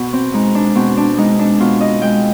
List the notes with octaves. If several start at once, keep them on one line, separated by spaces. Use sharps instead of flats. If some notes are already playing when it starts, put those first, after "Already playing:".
Already playing: B2
C4
G#3 D#4
D4
B2 C4
D4
G#3 D#4
D4
B2 F4
D#5
G#3 G5